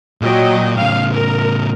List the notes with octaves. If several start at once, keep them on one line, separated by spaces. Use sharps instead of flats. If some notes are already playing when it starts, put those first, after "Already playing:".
A#2 F#3 D#5 G5
A2 C#3 F5
A#4